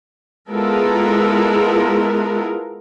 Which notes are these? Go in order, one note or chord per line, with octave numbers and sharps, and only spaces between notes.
G#3 B3 E4 F4 A4 A#4